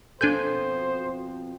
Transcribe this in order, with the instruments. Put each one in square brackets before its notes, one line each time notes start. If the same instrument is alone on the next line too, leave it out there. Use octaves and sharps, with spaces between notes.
[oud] F2 B2 [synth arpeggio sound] D4 G#5 G6 [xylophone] A4 G#6 [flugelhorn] C5